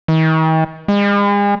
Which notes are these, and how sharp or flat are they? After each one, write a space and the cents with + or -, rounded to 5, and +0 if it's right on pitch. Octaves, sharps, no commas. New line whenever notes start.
D#3 +45
G#3 -40